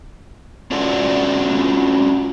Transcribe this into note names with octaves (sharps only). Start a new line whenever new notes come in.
C#4 D4 F4 F#4 A4 D5